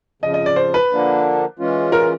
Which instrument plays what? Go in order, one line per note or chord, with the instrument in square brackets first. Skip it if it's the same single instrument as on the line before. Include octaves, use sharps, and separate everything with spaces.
[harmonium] F2 C#3 F3 [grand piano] D#5
[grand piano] D#5
D5
C5
B4
[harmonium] D3 F3 A#3 D4
E3 G#3 C#4 F4
[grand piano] A#4